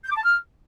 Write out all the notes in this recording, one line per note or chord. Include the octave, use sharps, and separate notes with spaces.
G6
D6
A5
F6